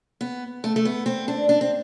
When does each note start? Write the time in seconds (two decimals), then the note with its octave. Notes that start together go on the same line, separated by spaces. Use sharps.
0.21 B3
0.64 A3
0.76 A3
0.85 B3
1.06 C4
1.28 D4
1.49 D4
1.61 C4